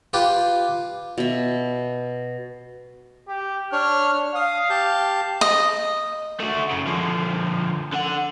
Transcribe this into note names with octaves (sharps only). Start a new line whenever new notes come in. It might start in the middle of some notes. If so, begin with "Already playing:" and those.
F4 G4 B4
B2 E5
G4
D4 C#5 F6
F5 D#6
G4 A5 G6
D#5
A3 F#4
F#2 C#3
D3 F3
D3 F#5